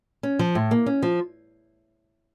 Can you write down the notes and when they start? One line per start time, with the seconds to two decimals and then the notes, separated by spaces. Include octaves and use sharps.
0.23 C#4
0.39 F3
0.55 A2
0.71 A#3
0.86 C#4
1.03 F3